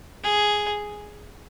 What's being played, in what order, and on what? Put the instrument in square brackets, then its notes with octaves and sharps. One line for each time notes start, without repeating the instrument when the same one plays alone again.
[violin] G#4